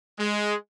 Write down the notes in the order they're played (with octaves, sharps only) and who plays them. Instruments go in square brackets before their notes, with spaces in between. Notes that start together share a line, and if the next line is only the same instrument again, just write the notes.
[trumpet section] G#3